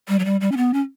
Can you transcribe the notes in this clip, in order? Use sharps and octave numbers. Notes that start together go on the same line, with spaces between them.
G3
F#3
G3
G3
C#4
B3
C#4